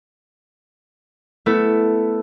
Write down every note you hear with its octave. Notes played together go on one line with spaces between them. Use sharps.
A3 B3 E4 A4